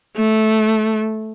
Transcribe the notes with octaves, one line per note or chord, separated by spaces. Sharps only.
A3